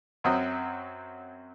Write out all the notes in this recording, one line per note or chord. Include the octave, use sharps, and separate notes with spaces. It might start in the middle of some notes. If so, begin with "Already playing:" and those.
F#2 F#3 C4 D#6